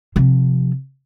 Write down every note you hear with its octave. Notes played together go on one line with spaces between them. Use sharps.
C3 F3